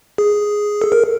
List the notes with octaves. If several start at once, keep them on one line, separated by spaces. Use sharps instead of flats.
G#4
A4
A#4